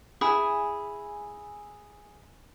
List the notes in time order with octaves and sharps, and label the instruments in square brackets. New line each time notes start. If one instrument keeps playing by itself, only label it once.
[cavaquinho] E4 G#4 G#5